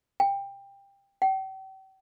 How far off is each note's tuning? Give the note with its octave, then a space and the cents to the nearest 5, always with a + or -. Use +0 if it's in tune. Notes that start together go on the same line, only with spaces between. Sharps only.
G5 +20
G5 -40